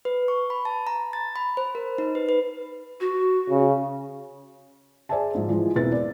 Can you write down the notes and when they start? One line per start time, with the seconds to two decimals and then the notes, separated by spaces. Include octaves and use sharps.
0.05 B4
0.28 C#6
0.50 B5
0.65 A5
0.87 A#5
1.13 A6
1.36 B5
1.57 C5
1.75 A#4
1.98 D#4
2.15 B4
2.29 B4
3.00 F#4
3.50 C#3
5.09 G#4 C5 D5 E5 G#5 A5
5.35 G#2 F3
5.49 E3 F3 G#3
5.75 E1 C4 E4 B4 A6
5.92 D5